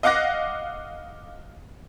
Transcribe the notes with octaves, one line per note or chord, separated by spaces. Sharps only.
D#5 F5 F#5 D6 F#6 A#6